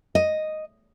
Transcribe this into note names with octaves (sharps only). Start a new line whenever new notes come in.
D#5